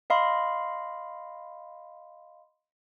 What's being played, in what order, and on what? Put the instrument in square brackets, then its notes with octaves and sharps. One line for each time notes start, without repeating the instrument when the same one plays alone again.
[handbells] D#5 F5 B5 C6